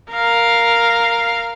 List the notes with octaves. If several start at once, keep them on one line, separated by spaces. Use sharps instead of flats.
A#4 F5